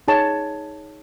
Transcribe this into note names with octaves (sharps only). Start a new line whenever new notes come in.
D#4 G#4 C#5 A5